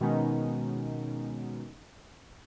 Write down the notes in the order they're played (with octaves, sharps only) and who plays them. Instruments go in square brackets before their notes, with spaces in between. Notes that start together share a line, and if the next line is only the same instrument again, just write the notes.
[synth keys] B2 D#3 G#3 B3 C#4 D#4